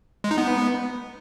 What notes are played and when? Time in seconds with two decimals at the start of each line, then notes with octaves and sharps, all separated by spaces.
0.24 G#3
0.31 D#4
0.38 B3